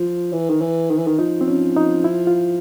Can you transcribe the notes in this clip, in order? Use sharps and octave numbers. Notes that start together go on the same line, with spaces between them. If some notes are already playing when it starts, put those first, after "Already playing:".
Already playing: F3
E3
D#3
E3
D#3
E3
D#3
F3 D#4
C4
C#4
D#4
E4
F4